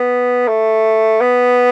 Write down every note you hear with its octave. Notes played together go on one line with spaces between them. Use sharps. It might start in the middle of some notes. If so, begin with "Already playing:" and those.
Already playing: B3
A3
B3